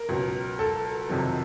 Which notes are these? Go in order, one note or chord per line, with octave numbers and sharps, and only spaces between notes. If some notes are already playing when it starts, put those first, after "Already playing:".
Already playing: A#4
C#2 B2 F#3
A4
F2 C3 D#3 F#3